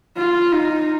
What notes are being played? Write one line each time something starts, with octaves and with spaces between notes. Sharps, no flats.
F4
D#4